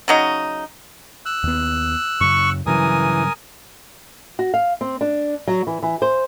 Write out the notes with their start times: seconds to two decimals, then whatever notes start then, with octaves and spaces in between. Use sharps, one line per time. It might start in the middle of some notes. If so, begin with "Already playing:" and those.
0.08 C#3 F#3 D#4
1.26 E6 F#6
1.43 D#2 B3
2.21 F#2 C#3 C#6
2.66 G2 C#3 E3 F#3 A#4 G#5 D#6
4.39 F#4
4.54 F5
4.81 C4
5.01 D4
5.47 F#3
5.67 E3
5.83 E3
6.02 C5